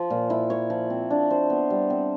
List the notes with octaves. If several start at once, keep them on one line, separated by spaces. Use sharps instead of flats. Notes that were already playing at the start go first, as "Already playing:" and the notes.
Already playing: F3
A#2
E4
C#5
F3
C4
D4
C5
B3
G3
C4